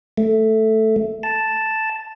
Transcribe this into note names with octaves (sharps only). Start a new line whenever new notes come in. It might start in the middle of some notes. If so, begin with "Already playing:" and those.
A3
A5